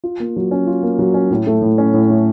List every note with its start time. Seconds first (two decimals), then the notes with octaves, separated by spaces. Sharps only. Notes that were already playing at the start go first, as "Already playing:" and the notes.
0.04 F4
0.20 A#3
0.36 F#3
0.51 C#4
0.67 F4
0.83 A#3
0.99 F#3
1.14 C#4
1.31 A2
1.47 A3
1.62 A2
1.78 C#4
1.94 A2
2.10 A3